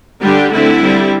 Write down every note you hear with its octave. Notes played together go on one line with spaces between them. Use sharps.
D3 G3 D4 G4
D3 A3 C4 E4
G3 C4